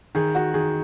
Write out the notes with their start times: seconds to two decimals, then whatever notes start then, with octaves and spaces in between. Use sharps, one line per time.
0.15 D#3 G#4
0.35 F#4
0.54 D#3 G#4